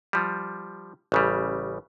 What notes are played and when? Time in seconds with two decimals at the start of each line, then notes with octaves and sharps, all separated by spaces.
0.13 F3 G3
1.12 A1 C#3 G3